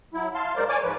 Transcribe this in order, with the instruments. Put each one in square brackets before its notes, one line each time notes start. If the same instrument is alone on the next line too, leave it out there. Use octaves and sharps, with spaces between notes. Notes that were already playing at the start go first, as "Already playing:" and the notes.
[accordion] F#3 E4
F5 A5 C6
G#2 G#3 A#4 C5 D5
C#5 D5 G#5 D6
G#2 F3 B4